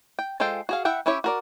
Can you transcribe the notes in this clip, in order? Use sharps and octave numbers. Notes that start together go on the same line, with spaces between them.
G5
G#3 F4 A4 C5 G5
F#4 G#4 F5
E4 E5 F#5 G5
C#4 E4 G4 C#5 E5
F#4 A#4 D5